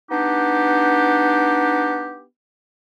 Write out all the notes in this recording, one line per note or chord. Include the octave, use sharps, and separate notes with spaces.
B3 D4 D#4 G4